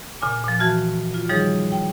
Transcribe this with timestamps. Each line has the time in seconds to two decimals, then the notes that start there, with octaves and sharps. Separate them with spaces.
0.21 A#2 C#3 G#5 D6
0.44 A#2 F3
0.59 E3 F#4 A5 F6
1.14 F4
1.29 D#3 F3 G3 D#4 G#4 C#5
1.72 G5